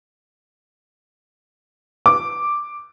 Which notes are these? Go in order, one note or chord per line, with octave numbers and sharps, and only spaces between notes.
D6